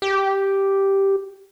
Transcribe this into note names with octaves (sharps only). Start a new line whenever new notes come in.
G4